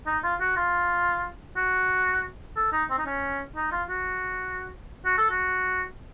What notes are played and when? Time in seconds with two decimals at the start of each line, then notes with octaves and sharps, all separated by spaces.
0.07 D#4
0.24 F4
0.40 F#4
0.57 F4
1.56 F#4
2.56 A4
2.73 D#4
2.90 C4
2.98 D#4
3.06 C#4
3.56 D#4
3.72 F4
3.89 F#4
5.06 F#4
5.18 A4
5.30 F#4